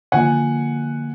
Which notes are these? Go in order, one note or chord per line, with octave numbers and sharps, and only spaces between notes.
D3 F3 A#3 F#5 G#5